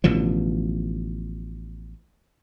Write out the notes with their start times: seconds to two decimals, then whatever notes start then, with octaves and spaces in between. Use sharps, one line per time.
0.04 A1 B2 D3 F3